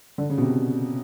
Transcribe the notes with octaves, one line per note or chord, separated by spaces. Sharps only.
D3
C#3
B2
C3